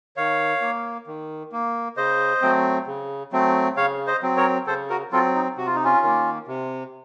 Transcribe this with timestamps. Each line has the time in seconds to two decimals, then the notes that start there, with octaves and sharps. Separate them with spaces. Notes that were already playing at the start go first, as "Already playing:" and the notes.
0.17 D#3 C#5 F5
0.61 A#3
1.07 D#3
1.52 A#3
1.97 C#3 C5 D#5
2.42 F#3 A3 C4
2.87 C#3
3.32 F#3 A3 C4
3.77 C#3 C#5 F5
4.07 C5 D#5
4.22 F#3 C4
4.37 A#4 C#5
4.67 C#3 A4 C5
4.90 F#4 A#4
5.12 F#3 C4 F4 A4
5.35 D#4
5.57 C3 F#4
5.66 F4
5.75 D#4
5.84 C#4 F4
6.02 D#3 A#3
6.47 C3